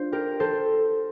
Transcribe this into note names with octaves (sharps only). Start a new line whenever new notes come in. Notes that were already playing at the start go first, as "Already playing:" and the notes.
Already playing: D4 F4 C5
G4 A#4
A4 C5